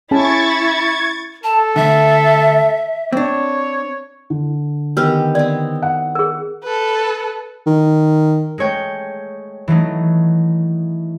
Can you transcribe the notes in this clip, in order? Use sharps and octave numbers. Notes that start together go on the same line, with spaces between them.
C#4 E4 G#4 A5 C#6 G#6 A6
A4 A5
D2 G2 D3 E5
C4 D4 C#5
D3
D#3 B3 D4 G4 A#4 B4
B3 C4 D5
F#5
G#4 A#4
A4 B4
D#3
G#3 A3 C#5 G5
E3 F#3 A3 D#4